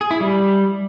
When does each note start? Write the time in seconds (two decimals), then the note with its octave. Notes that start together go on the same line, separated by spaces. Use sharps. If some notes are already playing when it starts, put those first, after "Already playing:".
0.01 G#4
0.11 E4
0.20 G3